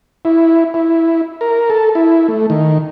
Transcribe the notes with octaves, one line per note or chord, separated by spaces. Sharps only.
E4
E4
A#4
A4
E4
A3
D#3